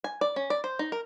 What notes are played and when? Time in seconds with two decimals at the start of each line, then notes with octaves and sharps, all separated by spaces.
0.04 G#5
0.21 D5
0.36 C#4
0.50 D5
0.64 C5
0.79 D#4
0.92 A#4